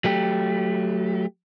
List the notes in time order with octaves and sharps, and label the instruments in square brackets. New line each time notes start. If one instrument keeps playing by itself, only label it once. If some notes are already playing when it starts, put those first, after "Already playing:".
[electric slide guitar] F#3 A3 G4